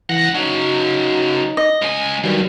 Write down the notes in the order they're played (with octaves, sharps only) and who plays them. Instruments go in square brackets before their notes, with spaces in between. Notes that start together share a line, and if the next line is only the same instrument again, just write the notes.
[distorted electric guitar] C#2 F#5 [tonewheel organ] E3 A#6
[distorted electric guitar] C#3 F#3 [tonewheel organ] D#4
[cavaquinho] D#5
[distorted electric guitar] C#2 G#5
[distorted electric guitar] G2 [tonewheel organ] D#3 F#3 G3